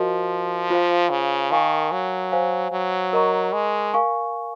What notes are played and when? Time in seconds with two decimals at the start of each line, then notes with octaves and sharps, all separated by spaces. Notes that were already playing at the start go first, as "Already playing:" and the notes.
Already playing: F3 F#4 A#4 D#5
0.70 F4 C5 F5
1.10 C#3
1.51 D#3 A#4 F5 G#5 C#6
1.92 F#3
2.32 C5 F5 G#5
2.72 F#3
3.13 A#4 D#5 A#5 C#6
3.53 G#3
3.94 A#4 F5 G#5 C#6